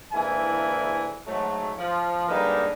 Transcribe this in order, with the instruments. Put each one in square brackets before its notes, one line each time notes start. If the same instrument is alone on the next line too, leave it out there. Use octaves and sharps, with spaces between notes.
[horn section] G#2 D3 E3 A#3 E4 G#5
G#2 F#3 A3
F3
D3 G3 G#3 A#3 D#4 B4